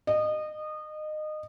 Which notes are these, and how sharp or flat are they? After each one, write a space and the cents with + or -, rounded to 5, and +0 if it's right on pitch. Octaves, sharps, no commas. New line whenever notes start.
D#5 -25